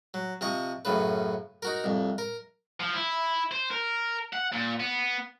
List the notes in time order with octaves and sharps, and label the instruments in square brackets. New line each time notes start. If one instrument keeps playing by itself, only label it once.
[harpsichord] F#3
C3 F3 D#5 C#6
F#2 A2 C#3 B4
D#4 F#4 A#4
C2 F2
A#4
[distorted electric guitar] F3
E4
C5
A#4
F#5
A#2
B3